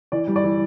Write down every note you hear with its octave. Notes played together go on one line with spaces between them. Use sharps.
E3 D5
G3
D5
E3